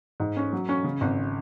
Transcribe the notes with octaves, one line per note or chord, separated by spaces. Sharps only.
G#2
C#4
F#3
C#4
C#3
G#1